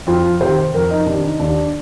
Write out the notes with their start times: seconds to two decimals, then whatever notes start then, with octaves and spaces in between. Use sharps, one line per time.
0.07 F2 F4
0.41 C3 D#3 C5
0.74 F2 A#4
0.90 D#4
1.06 C3 D#3 D4
1.24 D#4
1.40 D#2 D4